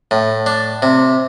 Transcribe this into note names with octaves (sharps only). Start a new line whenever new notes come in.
A2
D4
C3